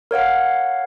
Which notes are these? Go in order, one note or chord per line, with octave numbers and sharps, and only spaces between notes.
A#4 C#5 F5 F#5